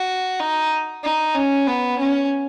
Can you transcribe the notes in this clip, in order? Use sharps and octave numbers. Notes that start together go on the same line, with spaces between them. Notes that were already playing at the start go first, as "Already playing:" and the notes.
Already playing: F#4
D#4
D#4
C#4
B3
C#4